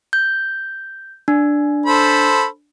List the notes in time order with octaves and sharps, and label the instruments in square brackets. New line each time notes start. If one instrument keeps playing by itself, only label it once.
[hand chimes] G6
D4
[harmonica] A4 C5 B5